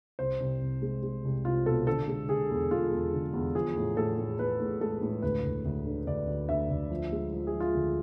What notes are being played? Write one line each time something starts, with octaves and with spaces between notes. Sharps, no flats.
C2 C5
C2
C2
G#3
G#3
C2
C2 F4
B2 A4
D3 A4
G#3
D3 G#4
E2
G#3 F4
E2
D3
E2
F3 G#4
A2
A2 A4
A2
A2 B4
A2
G#3 A4
A2
D2 B4
D2
D2
D3
D2 D5
D2
D2 E5
D2
F3
G#3
F3
G#4
F3
F4
D2